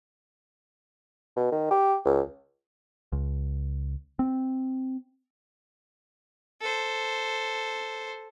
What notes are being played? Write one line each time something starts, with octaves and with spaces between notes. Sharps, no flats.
B2
D#3
G4
C#2
C#2
C4
A4 C5